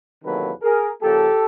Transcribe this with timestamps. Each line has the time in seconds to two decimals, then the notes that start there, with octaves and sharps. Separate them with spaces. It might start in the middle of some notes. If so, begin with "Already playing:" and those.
0.23 E2 C3 D#3 F#3 A#3 A4 B4
0.62 G#4 A#4
1.01 C#3 F3 A#3 G4 A4